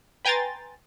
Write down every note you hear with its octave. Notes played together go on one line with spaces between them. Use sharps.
B4 G5 G#5 A#5 C6 A6